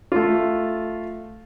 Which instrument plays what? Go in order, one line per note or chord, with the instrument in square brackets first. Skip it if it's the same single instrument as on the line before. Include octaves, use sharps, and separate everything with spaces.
[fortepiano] A3 F4